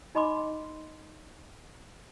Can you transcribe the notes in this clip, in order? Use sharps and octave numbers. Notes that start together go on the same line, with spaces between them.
D#4 D#5 B5 C6 D6